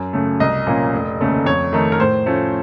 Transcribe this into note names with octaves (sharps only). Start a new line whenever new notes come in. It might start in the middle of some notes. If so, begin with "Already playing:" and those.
Already playing: F#2
C#3 A3
C2 D#5
A#2 F3 A#3 C#4
F1
D#2 C#3 A3
F2 C#5
D#3 A3 D#4
A#4
A2 C5
F3 A3 C#4